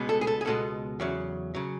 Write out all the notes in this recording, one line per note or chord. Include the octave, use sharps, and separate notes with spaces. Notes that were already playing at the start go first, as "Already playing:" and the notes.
Already playing: C#2 B2 G#3 B3
A4
G#4
A4
G#4
C#2 B2 G#3 B3 A4
E2 C#3 F#3
C#3 F#3